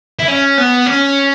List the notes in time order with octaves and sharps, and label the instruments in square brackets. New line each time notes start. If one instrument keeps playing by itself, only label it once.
[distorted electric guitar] E4
C#4
B3
C#4